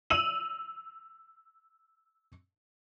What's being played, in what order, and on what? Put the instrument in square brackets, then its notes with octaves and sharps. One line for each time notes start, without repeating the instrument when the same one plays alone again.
[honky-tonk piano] E6 D#7 F7 F#7